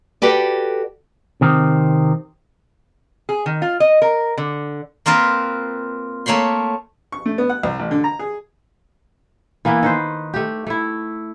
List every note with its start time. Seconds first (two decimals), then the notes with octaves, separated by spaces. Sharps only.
0.22 F#4 G4 A4 B4 D5
1.41 C3 D#3 C4
3.29 G#4
3.46 D#3
3.62 F4
3.80 D#5
4.02 A#4
4.38 D3
5.06 A#3 C4 F4 A#4 B4
6.26 A3 A#3 C#5 B5 C6
7.12 C#6
7.26 A3
7.38 B3
7.49 F#5
7.63 C2
7.79 A1
7.91 D3
8.04 A#5
8.19 G#4
9.65 E3 A#3 B3 E4
9.83 D#3 B4 C5
10.34 A3 G4
10.67 A3 E4